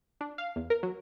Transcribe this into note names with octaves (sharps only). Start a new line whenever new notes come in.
D4
F5
E2
A#4
F#3